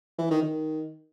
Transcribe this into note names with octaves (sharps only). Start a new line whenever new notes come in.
E3
D#3
D#3